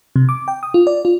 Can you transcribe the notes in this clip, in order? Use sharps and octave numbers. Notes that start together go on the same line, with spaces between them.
C3
D6
G5
D#6
F4
D5
F4